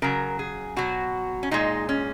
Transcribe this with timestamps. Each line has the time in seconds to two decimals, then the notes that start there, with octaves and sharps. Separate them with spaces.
0.02 C#3 F#3 A#4
0.39 G#4
0.76 B2 F#3 F#4
1.43 C#4
1.51 A#2 G#3 D#4
1.89 C#4